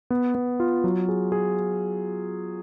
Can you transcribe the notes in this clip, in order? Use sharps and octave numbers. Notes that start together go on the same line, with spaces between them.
B3
B3
F4
F#3
G#4
G#4